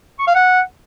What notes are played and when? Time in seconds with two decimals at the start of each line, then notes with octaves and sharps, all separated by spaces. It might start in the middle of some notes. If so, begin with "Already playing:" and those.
0.19 C#6
0.27 F5
0.35 F#5